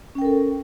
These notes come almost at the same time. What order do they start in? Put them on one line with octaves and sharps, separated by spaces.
C#4 G5 A#4 A4